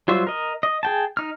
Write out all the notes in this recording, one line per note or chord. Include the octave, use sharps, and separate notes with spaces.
F#3 G3 F4 C5 E5
A#4 D#5
D#5
G#4 G5 A5
D#4 F6